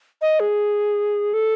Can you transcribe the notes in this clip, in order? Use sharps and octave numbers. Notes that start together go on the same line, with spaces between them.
D#5
G#4
A4